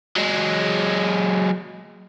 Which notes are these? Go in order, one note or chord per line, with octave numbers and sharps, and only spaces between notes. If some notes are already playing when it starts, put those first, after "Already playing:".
F#3 G#3